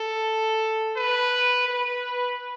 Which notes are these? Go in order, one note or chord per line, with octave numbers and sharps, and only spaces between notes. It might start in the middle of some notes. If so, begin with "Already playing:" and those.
Already playing: A4
B4
B4